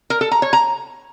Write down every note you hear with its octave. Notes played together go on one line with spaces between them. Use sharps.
A#4
A4
A#5
C#5
A#5